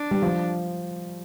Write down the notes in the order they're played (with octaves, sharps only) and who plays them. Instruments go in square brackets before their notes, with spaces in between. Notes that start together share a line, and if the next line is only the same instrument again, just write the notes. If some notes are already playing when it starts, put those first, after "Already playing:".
Already playing: [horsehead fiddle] D4
[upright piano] G3
F3